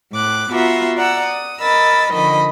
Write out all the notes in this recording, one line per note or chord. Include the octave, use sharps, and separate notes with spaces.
A2 D6 F#6
B3 F4 F#4 E5 A#5
D5 F#5 A#5 E6
D#6
A#4 D#5 B5 E6 A6
D3 D#3 F3 D#5 B5